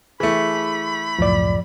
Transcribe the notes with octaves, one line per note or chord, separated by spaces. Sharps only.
E3 A3 G#4 B5
C#2 F#2 A2 F3 D5